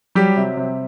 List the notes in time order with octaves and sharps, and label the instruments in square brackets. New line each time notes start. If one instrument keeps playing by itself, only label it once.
[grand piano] F#3 G3 G4
C3
C3